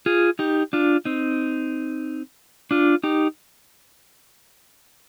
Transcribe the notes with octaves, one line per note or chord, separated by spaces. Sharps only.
F4 G#4
D#4 G4
D4 F4
C4 D#4
D4 F4
D#4 G4